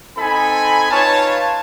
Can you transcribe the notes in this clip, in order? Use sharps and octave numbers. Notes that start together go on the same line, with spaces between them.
C4 D#4 A4 G#5 B5
D#4 F4 B4 C#5 F5 A5